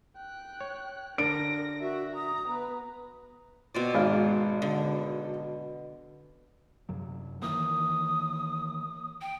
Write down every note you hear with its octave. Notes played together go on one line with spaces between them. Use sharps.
G5 F#6
C#5
D3 D4 A#4 A#6 D7
F#4 E5
A#5 D#6
B3 B4 A#5
B2 C4 D5
G#1 G#2 F5
D3
F#2 C3 F#3
D#3 E3 A#3 D#6
G5